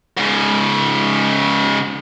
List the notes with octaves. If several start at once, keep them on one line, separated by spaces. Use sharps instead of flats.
G#2 C#3